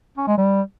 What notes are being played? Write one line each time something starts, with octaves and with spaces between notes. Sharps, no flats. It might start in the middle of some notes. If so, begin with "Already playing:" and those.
C#4
G#3
G3